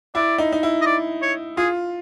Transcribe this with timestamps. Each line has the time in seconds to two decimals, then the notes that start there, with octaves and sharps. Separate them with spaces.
0.15 E4 D5
0.38 D#4
0.53 D#4
0.63 E4
0.82 D#5
0.86 D5
1.22 C#5
1.57 F4 G#4